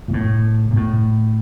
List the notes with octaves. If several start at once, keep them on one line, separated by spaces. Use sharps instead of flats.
A#2
A2
A#2
A2